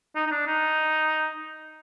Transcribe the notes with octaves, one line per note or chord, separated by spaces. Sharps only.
D#4
D#4
D4
D#4